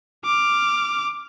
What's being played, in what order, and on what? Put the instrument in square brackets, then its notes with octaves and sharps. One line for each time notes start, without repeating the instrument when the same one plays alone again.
[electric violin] D6 F6